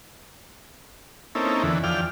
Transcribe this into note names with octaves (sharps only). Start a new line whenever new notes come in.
A#3 C4 C#4 D#4 E4 A4
E2 D3 E3
E2 F3 D5 G5 F6